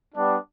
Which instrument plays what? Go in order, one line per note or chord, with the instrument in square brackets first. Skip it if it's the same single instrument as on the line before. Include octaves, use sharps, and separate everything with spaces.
[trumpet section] G3 B3 D4